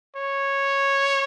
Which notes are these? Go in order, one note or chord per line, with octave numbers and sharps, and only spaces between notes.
C#5